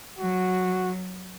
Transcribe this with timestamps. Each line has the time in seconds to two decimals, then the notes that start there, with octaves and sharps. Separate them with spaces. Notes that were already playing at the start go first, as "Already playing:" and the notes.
0.19 F#3 F#4